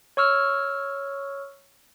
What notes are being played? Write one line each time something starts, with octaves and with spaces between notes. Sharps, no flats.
C#5 C#6 E6 F6